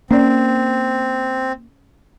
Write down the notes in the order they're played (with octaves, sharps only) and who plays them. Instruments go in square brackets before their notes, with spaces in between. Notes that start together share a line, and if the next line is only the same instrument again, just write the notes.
[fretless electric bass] A#3 [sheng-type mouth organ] C4 [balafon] C#4 D5